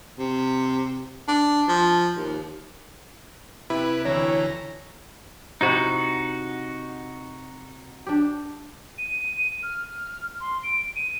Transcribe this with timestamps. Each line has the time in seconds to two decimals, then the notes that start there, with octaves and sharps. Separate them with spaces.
0.19 C3
1.28 D4
1.68 F3
2.17 D#2
3.70 C3 E4 B4
4.05 D2 E3 C#5 A#5
5.61 C3 D#4 E4 F#4
8.07 D4 G4
8.98 D#7
9.63 F6
10.40 C6
10.63 D7
10.96 D#7